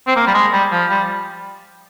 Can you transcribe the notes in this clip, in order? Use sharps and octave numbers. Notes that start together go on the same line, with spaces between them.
C4
A#3
G3
G#3
G3
F3
G3